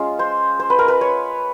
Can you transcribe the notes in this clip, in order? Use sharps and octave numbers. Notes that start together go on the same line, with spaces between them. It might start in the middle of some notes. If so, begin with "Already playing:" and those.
Already playing: G#3 C#4 F4
C5
C5
B4
A#4
B4
C#5